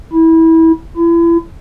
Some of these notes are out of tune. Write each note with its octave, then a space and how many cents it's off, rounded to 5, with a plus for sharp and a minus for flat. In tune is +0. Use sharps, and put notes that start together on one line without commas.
E4 -20
E4 +35